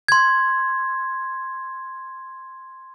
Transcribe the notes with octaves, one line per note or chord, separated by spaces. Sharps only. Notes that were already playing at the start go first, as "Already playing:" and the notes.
C6 G#6